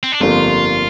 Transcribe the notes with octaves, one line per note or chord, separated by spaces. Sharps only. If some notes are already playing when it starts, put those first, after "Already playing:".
C4
D4
G1 F2 F3 A#3 F4 G4